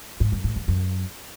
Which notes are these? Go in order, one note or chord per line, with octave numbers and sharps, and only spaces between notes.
G#2
F#2
A2
E2
F#2